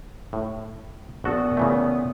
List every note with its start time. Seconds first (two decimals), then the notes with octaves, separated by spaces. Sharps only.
0.33 A2
1.24 A#1 A#2 B3 F#4 A4 D#6
1.57 C#3 E3 A3